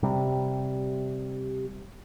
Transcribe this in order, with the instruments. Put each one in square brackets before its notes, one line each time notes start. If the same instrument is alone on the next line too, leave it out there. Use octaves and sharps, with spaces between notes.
[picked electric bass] C3 G3